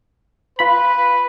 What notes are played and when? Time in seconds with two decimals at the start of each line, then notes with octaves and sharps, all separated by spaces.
0.59 F4 B4 B5